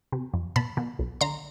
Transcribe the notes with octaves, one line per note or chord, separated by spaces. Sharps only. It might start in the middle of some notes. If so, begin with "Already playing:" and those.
C3
F2
B2 A5 B5
B2
B1
D3 A#5 C6